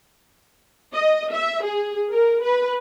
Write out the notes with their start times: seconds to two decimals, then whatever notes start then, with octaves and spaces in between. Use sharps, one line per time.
0.95 D#5
1.32 E5
1.64 G#4
2.12 A#4
2.44 B4